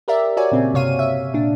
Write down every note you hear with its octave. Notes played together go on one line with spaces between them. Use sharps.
G4 A#4 D5 E5
F#4 C#5 D5 G#5
A#2 C#3 C4
G1 C3 C#5 F5 D#7
E5
A#2 D4